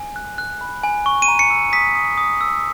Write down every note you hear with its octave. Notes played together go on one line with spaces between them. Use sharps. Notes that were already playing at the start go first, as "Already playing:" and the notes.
Already playing: G#5
F#6
F#6
B5
G#5
C#6
D#7
A#5
C#7
E6
D#6 B6
D#6
D#6
E6